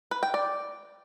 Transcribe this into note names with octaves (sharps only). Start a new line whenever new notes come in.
B4
G5
D5